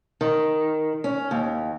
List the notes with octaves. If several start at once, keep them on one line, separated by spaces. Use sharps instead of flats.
D#3
C#4
D#2